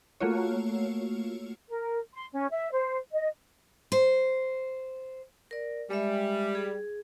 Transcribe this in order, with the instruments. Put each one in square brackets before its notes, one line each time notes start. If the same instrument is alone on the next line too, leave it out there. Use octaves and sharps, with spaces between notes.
[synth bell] A3 A#3 F4 F#4 C#5
[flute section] A#4
C6
C#4
E5
C5
D#5
[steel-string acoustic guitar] C5
[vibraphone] A#4 D5
[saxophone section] G3 [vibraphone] G#3 E5
[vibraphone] G#4